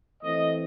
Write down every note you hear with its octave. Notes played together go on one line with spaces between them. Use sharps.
E3 A3 C4 D#5